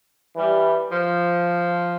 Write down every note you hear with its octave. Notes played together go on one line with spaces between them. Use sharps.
E3 G3
F3